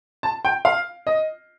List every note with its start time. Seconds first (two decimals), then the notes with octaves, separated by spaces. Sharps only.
0.23 A5
0.45 G5
0.65 F5
1.07 D#5